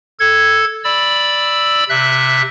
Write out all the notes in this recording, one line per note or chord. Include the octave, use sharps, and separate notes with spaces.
A4 G#6
D5 B5 E6
C3 E5 F#6